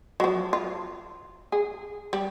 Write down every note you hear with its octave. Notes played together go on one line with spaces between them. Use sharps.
F3 F#3
F4
G#4
G3